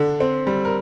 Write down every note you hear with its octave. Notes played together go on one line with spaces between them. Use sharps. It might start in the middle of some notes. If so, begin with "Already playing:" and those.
Already playing: D3 D4
C4
G3
A#4